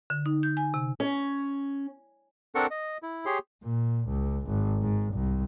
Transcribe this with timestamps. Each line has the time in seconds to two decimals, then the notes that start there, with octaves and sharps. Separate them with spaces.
0.10 D3
0.26 D#4
0.43 G6
0.57 G#5
0.74 C3
1.00 C#4
2.55 C4 D4 A4 A#4 F#5 C#6
2.71 D#5
3.03 E4
3.26 G4 G#4 C#5 C6
3.63 A#2
4.08 C#2
4.46 G#1
4.82 G#2
5.14 C2